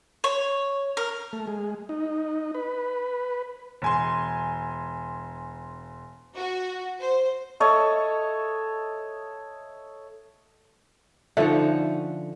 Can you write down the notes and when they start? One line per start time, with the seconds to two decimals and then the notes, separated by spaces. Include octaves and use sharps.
0.24 C#5
0.97 A#4
1.33 A3
1.47 G#3
1.89 D#4
2.55 B4
3.82 E1 G#5 C6
6.36 F#4
7.00 C5
7.60 A4 C#5 D#5 E5
11.37 D3 F3 C#4 D#4 E5 F#5